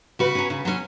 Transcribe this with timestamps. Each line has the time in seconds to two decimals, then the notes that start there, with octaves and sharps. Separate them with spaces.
0.19 C#3 F#4 B4
0.35 F#3 C#4
0.50 C#3
0.65 F#3 C#4